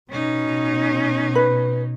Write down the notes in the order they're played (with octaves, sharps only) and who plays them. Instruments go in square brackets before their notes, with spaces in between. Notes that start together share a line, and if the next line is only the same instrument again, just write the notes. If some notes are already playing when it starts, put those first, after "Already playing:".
[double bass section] B2 [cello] C#4 D#4
[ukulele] B4